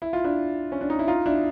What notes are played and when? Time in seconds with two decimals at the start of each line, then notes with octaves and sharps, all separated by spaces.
0.02 E4
0.13 F4
0.24 D4 E4
0.72 C#4
0.81 D4
0.90 D#4
0.99 E4
1.08 D#4 F4
1.26 D4 E4